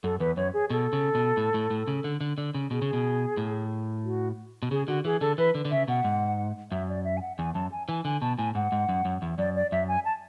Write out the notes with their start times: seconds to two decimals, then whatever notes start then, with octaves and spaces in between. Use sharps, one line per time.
0.04 F#2 A4
0.20 E2 B4
0.37 F#2 C#5
0.54 G#4
0.70 B2 A4
0.93 C#3
1.15 B2
1.37 A2
1.54 A2
1.70 A2
1.87 C#3
2.04 D3
2.21 D3
2.38 D3
2.54 C#3
2.71 B2 G#4
2.82 C#3
2.93 B2
3.37 A2
4.04 F#4
4.63 B2
4.71 C#3 G#4
4.88 D3 F#4
5.05 E3 G#4
5.21 D3 A4
5.38 E3 B4
5.55 D3
5.65 D3
5.71 C#3 E5
5.88 B2 F#5
6.04 G#2
6.71 F#2 E5
6.89 D5
7.05 E5
7.17 G#5
7.21 F#5
7.38 E2 G#5
7.54 F#2 A5
7.72 G#5
7.89 E3 G#5
8.05 D3 G#5
8.21 B2 A5
8.38 A2 G#5
8.55 G#2 F#5
8.72 G#2
8.89 F#2
9.05 F#2
9.22 E2
9.38 F#2 D5
9.56 D5
9.72 F#2 E5
9.88 G#5
10.05 A5